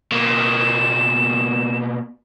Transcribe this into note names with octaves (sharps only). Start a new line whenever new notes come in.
B2 A#3 E7